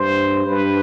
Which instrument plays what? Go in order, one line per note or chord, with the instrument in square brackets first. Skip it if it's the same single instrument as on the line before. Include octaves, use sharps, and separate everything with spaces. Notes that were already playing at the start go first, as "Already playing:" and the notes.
Already playing: [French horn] G2 [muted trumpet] C5
[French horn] G2 [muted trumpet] B4